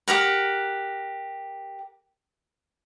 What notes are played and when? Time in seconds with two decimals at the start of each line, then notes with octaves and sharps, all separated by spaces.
0.08 G4 A#4 F#5